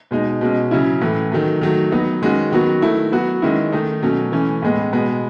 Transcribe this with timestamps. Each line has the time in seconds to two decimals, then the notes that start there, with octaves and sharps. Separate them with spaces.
0.11 B2 G#3 D#4
0.41 B2 G#3 C#4
0.71 C#3 F#3 C#4 E4
1.01 A2 E3 A3
1.32 D#3 F#3 A3
1.61 D#3 F#3 A3
1.92 F#3 B3 D#4
2.22 D#3 G#3 C#4 F#4
2.52 D#3 F#3 B3 F#4
2.82 D#3 A3 E4
3.12 F#3 B3 F#4
3.42 D#3 G#3 C#4 E4
3.72 D#3 A3 D#4
4.02 B2 F#3 A3 C#4
4.32 E3 A3 C#4
4.62 A2 G#3 B3
4.93 B2 G#3 B3